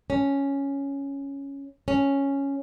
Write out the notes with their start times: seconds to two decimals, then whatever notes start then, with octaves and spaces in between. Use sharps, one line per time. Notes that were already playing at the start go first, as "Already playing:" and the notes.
0.10 C#4
1.88 C#4